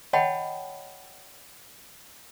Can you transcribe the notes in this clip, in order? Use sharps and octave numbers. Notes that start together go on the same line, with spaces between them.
C#5 D#5 F#5 G5 A5 B5